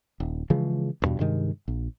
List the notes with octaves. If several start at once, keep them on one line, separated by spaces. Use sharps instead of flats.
D#1
C#3 E3 F3 G#3
A1 E2 G2 B2
G2 C3 D#3 G#3
A#1